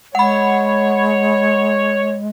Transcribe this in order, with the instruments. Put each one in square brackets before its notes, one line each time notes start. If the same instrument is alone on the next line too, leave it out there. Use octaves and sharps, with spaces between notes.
[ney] G#3 [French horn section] C#5 [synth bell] F#5 B5